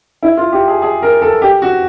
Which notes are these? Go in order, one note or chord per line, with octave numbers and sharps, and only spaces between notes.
E4
F4
G4
G#4
G#4
A#4
A4
G4
F#4